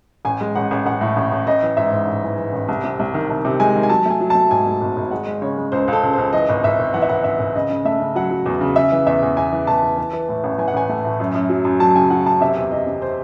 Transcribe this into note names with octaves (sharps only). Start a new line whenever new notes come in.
A1 G#5
G#3
A1 F#5
A1
A1 F#5
A2
A1
A1
A1 D#5
E3
G#2 E5
G#2
A1
E3
E3
A1
C2
C3
C2
D#3
C2
C3
G#3 G#5
D#3
G#5
F#3 A5
A3 G#5
F#3
A3 A5
G#2 G#5
A3
G#1
G#1
G#3 F#5
G#3
C#3 C#5
G#3
C#2 C5
C#2
A4
C#2
C#2 C5
E3 D#5
G#1
G#1 E5
G#1
E3 F#5
E5
G#1 F#5
G#1 E5
G#1
C#3 D#5
C#3
A3 E5
C#3
F#3 F#5
F#3
E2
C#3
C#3 E5
E3
E2 E5
E2
E2 G#5
E3
E2 A5
E3
E3
E3
A2
A1
E3 G#5
F#5
A1 G#5
A3
A2
F#2
F#2
F#3
F#2
F#3 A5
C#3 G#5
F#3 F#5
F#2 A5
C3 E5
E2
C3 D#5
C3
C5